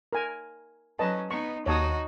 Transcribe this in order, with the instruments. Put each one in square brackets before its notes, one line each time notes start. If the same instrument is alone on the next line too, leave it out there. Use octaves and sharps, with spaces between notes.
[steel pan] A#4 G#5
[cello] F#3 C#4 [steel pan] B4 D#5 A5
[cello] B3 D#4 [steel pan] C#6
[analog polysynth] D#2 [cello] D#4 F#4 [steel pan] C#5 A5 D#6